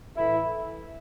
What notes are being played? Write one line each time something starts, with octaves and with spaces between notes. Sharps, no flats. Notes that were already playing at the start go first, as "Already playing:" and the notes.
A2 E3 A3 E4